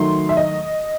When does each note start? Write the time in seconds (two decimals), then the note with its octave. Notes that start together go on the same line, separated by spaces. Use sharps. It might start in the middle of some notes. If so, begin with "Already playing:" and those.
Already playing: D#3 F#3 A3 C6
0.29 E5
0.37 D#5